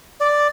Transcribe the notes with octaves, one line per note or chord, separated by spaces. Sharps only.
D5